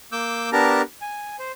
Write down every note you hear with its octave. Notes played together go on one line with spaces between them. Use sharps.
A#3 D6 E6 G6
B3 D4 G4 A#4 A5 A#5
G#5
C5